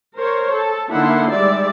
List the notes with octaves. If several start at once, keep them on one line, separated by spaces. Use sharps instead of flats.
A#4 C5 C#5
A4
D3 A#3 D#4 E4 F#5 C6
G3 G#3 D5 E5